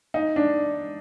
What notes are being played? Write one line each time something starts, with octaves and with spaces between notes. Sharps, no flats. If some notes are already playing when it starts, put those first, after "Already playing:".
D#4
D4